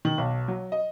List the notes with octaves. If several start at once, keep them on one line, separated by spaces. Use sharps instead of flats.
D#3
B1
F#3
D#5